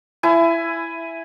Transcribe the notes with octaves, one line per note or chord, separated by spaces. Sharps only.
E4 G#5